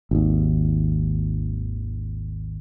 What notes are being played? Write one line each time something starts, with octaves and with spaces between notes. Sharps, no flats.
G#1 D#2